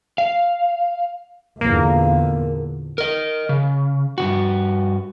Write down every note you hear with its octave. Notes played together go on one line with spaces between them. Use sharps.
F5
E2 A#2 D3 A#3
A#4 D#5
C#3
G2 B2 F#4